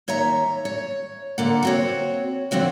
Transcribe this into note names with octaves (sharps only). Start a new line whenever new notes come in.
D#2 C#5 E5 A#5
C#5
D3 A#3 F#5
C4 F#4 C#5
D3 F3 C4 F#4 C#5